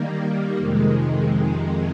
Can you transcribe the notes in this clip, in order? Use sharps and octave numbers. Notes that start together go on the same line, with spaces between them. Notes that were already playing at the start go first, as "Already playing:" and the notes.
Already playing: D#3 G3 A#3
F2 C3 D#3 G#3